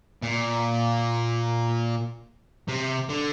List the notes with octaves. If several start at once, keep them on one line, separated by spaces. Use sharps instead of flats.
A#2
C3
D3